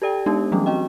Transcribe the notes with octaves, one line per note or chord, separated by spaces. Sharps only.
G4 A4 D5 G5
G#3 B3 D4 D#4 G4
E3 F#3 G3 A3 C#4 D4
C4 F#4 D#5 G5